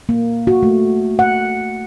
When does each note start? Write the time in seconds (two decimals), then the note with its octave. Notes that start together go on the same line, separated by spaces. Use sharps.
0.09 A#3
0.47 F#4
0.63 A3
1.19 F#5